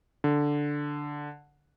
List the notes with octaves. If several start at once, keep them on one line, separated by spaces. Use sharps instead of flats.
D3